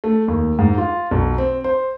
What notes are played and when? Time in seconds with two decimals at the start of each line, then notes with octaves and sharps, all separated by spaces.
0.04 A3
0.28 D#2
0.59 G#2
0.78 F4
1.11 B1
1.38 C4
1.64 C5